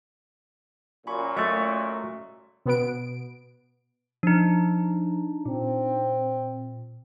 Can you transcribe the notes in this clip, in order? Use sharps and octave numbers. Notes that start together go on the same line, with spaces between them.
F#2 A#2 G#5 B5 C#6
F#3 A3 D#5 E5 C#6
B2 B3 D7
F3 D4 D#4
A#2 C4